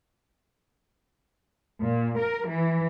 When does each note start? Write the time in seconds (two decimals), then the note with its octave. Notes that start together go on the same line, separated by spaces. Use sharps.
1.81 A#2
2.19 A#4
2.51 E3